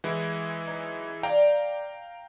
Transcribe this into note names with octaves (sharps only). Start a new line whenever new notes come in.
E3 G#3 E4 F#5
F#3 C#4 D#4
D5 F5 G5 A#5